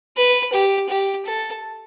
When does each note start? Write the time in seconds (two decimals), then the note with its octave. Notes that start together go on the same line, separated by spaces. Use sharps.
0.17 B4
0.53 G4
0.89 G4
1.26 A4